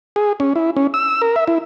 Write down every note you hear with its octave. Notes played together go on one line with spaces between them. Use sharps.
G#4
C#4
E4
C#4
E6
A#4
E5
E4